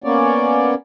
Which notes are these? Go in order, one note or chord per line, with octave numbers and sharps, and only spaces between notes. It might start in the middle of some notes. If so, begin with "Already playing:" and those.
A#3 B3 C#4 C#5 D5